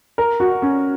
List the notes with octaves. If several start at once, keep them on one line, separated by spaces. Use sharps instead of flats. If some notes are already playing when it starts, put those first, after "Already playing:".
A#4
F#4
C#4